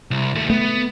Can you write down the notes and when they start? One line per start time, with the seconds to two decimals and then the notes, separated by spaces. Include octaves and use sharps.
0.11 C2
0.35 D#2 A3
0.50 A3 B3